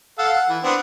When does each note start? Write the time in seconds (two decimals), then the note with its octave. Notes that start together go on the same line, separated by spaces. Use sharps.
0.19 A4 F5 F#5
0.33 F#5
0.49 E3
0.63 B3 C4 D4